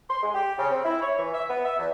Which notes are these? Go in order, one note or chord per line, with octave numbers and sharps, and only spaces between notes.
C6
G#3
G4
C#3
C4
E4
C#5
E3
E5
B3
E5
E2